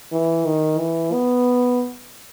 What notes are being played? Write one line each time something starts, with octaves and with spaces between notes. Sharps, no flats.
E3
D#3
E3
B3